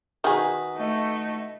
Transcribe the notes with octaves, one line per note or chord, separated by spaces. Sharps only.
D#3 F#4 G#4 B4 D#6
A3 D#4